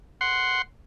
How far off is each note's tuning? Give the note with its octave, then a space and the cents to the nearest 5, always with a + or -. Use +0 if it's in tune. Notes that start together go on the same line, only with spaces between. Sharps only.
F#5 +0 C6 +0